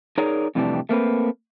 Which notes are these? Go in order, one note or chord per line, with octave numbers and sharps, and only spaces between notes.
D#4 G#4 A#4 C#5 D5
F2 A2 C3 E3 G3 D4
A3 A#3 C4 B4